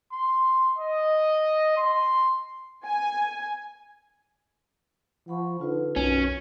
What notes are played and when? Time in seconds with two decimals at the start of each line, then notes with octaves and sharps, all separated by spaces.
0.13 C6
0.79 D#5
1.77 C6
2.86 G#5
5.28 F3 F#5 B5 C#6
5.60 D3 D#4 F4 B4
5.96 B1 F#2 C#4